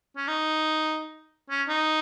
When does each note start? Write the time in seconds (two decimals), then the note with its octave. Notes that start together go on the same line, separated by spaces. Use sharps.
0.16 C#4
0.28 D#4
1.50 C#4
1.68 D#4